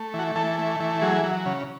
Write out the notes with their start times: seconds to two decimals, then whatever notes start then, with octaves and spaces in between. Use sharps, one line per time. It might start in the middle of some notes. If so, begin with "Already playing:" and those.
Already playing: A3
0.14 E3 F#4
0.36 E3 A4
0.58 A3
0.80 E3
1.01 F#3 G#4
1.24 F#3
1.46 C#3